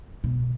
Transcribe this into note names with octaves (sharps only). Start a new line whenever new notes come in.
B2